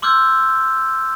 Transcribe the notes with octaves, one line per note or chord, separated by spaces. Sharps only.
C6 D6 E6 F6 G6 G#6